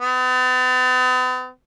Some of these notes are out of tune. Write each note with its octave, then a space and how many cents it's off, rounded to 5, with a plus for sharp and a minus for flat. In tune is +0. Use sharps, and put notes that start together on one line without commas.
B3 +45